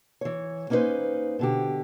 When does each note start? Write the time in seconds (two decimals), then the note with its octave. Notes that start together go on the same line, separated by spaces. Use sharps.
0.21 E3 C#5
0.70 A#3 C#4 D#4 E4 B4 C5
1.39 B2 D3 G4